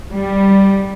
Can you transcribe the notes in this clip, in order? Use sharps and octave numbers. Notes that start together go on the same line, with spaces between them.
G3